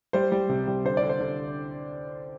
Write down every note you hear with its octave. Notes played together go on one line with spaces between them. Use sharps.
G3 C5
G3
C3
G3
D3 C5
D5
D3
C5
D3